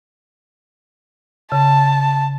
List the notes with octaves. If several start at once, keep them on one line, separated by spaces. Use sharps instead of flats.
C#3 A5